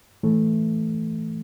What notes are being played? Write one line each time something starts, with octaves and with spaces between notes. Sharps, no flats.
A2 E3 A3